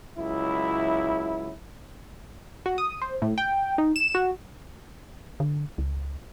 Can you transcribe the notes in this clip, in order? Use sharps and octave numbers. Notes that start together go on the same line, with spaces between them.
C#2 F#3 E4
F#4
D#6
C5
A2
G5
D#4
E7
F#4
D3
C#2